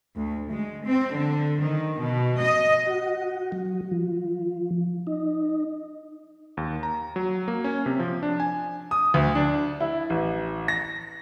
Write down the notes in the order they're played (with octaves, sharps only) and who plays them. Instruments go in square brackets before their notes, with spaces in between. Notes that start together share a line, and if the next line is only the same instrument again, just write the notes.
[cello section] D2
G#3
C4
D3
D#3
B2
D#5
[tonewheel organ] F#4
F#3
F3
D#4
[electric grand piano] D#2
A#5
F#3
A#3
C#4
C3
F3
D4
G#5
[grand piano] D#6
D2
D4
E4
A1
A#6